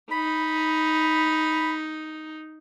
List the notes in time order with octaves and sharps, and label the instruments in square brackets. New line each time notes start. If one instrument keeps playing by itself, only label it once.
[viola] D#4 [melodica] B5